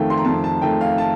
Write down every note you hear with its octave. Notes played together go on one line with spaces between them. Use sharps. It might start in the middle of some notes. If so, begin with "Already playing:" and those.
Already playing: F2 D#3 A3 F5 G5
C6
A#5
F2 A5
A5
D#3 A3 G5
F5
A5